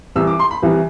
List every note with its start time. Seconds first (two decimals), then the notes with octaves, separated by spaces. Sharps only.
0.15 C2 C3 E3 E6
0.27 D6
0.39 C6
0.51 B5
0.62 C2 C3 E3